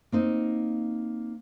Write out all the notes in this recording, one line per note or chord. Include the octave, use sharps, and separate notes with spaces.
A#3 C4 D#4